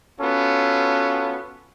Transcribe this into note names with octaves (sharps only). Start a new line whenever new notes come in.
B3 C#4 F4 F#4 A4